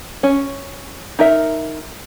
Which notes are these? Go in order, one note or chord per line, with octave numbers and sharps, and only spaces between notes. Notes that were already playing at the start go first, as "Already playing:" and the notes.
C#4
D#4 A#4 E5